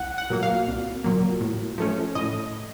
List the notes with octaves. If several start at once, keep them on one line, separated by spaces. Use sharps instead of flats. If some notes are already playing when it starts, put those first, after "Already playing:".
Already playing: C2 F#5
F#5
A#2 F#3 A#3
F5
C2
A#2 F#3 A#3
A2
F3 A3 C#4
A2 D#5